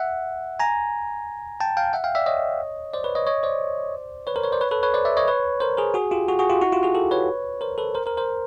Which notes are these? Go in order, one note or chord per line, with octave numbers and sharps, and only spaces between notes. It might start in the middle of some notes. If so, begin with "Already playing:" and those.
Already playing: E5 F#5
G#5 A#5
G5 A5
F5 G5
E5 F#5
F5 G5
D5 E5
C#5 D#5
C5 D5
B4 C#5
C#5 D#5
C#5 D#5
C5 D5
B4 C#5
A#4 C5
B4 C#5
C5 D5
B4 C#5
A4 B4
B4 C#5
C5 D5
D5 E5
C#5 D#5
B4 C#5
A#4 C5
G#4 A#4
F#4 G#4
F4 G4
F#4 G#4
F#4 G#4
F4 G4
E4 F#4
F4 G4
F#4 G#4
G4 A4
B4 C#5
A#4 C5
A4 B4
A#4 C5
A#4 C5
A#4 C5